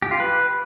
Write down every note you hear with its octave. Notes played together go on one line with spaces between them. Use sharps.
G4
F4
B4